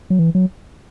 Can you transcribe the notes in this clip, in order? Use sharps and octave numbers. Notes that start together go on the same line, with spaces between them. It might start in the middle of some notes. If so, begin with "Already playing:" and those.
F#3
E3
F#3